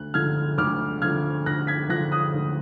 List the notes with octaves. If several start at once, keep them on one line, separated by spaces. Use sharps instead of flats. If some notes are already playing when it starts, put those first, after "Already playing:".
Already playing: D2 F#6
D3 F3 F6 G#6
D2 D6 F6
D3 F3 F6 G#6
D2 F#6 A#6
G#6 B6
D3 F3 F#6 A#6
D#6 F#6
D2